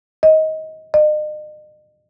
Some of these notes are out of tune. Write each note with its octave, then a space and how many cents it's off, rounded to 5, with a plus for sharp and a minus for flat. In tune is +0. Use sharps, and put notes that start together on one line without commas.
D#5 +20
D#5 -40